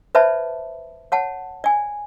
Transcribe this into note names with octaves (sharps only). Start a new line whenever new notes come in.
B4 C5 D5 E5 A5 B5
C#5 F#5 A5
D5 G#5